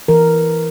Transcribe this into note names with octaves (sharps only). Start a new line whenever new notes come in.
E3 A#4